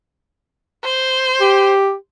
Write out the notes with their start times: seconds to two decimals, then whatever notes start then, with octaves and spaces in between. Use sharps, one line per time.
0.84 C5
1.41 G4